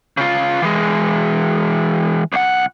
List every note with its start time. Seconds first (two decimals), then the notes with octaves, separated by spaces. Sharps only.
0.17 C#3 F4
0.62 E3 G#3
2.33 C2 F#5